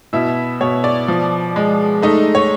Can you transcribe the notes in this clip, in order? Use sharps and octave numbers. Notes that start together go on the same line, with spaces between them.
B2 E4 E5
B2 C#5
D5
F3
G#3
A3 D#4 D#5
C#5